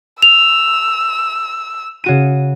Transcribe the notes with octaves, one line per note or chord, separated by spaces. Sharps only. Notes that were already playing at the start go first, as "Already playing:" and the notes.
E6 F7
C#3 F#4 D#7